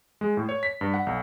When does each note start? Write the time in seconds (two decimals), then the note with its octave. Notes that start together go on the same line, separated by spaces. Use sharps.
0.21 G#3
0.37 A2
0.49 C#5
0.63 B6
0.81 G2
0.94 F#5
1.06 B1